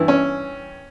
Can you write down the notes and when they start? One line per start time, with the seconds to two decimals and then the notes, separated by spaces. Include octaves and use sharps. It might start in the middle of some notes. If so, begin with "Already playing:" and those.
Already playing: G2 E3
0.08 C#4